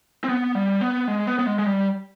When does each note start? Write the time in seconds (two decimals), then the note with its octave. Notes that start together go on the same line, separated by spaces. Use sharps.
0.24 C4
0.29 B3
0.55 G3
0.81 B3
1.08 G#3
1.27 B3
1.39 B3
1.46 G#3
1.59 G#3
1.66 G3